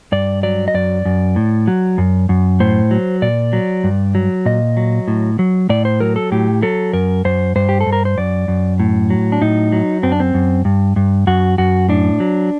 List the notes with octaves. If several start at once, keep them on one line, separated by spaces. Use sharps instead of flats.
G2 D5
F#3 D5
D#5
F#2 D5
F#2
A2
F#3
F#2
F#2
A2 C5
F#3
A#2 D5
F#3
G2
F#3
A#2 D#5
F#3
A2
F#3
A2 D5
C5
F#3 A#4
A4
A2 G4
F#3 A4
F#2 A#4
F#2 C5
G2 C5
G4
A4
G2
A#4
C5
F#2 D5
F#2
A2
F#3
D4
A2 D#4
F#3
F#2 C4
D4
C4
F#2
G2
G2
F#2 F#4
F#2 F#4
A2 D4
F#3